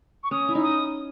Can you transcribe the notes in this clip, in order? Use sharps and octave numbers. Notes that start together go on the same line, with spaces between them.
C#6
C#4 D#6
E4
D#4
D#6